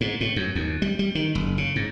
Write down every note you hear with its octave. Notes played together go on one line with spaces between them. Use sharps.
G#2
A2
F#2
D#2
G3
G3
D#3
F#1
C#3
G#2